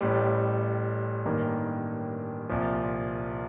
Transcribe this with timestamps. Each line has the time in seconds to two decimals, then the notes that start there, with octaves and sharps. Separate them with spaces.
0.01 A1 A2 G3
1.25 A1 G2 D#3 A#3
2.49 C2 A#2 F3